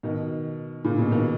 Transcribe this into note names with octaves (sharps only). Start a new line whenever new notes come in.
B2 D#3
A#2 C#3
B2
B2 D#3